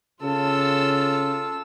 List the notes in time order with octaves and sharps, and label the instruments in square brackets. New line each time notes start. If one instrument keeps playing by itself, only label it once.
[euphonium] C#3 [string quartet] F4 A4 E6